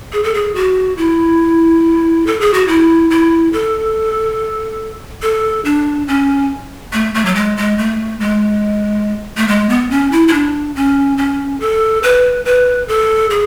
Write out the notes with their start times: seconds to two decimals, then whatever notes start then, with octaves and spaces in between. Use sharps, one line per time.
0.13 G#4
0.24 A4
0.34 G#4
0.55 F#4
0.98 E4
2.27 A4
2.40 G#4
2.54 F#4
2.68 E4
3.10 E4
3.53 A4
5.22 A4
5.65 D4
6.08 C#4
6.93 A3
7.14 A3
7.25 F#3
7.35 G#3
7.57 G#3
7.78 A3
8.20 G#3
9.37 A3
9.48 G#3
9.69 B3
9.91 C#4
10.12 E4
10.28 E4
10.33 D4
10.76 C#4
11.18 C#4
11.60 A4
12.03 B4
12.45 B4
12.88 A4
13.30 G#4